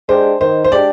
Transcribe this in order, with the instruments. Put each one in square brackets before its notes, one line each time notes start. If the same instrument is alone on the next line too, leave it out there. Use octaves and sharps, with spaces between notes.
[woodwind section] G#3 D4 G4 [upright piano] C5
[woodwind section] D#3 [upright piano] C5
[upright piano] C5
[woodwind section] G#3 D4 G4 [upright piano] D5